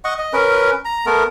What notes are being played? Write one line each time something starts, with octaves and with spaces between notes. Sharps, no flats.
D#5 F#5 C#6
D#5
C#4 A#4 B4
A#5
A3 B3 A#4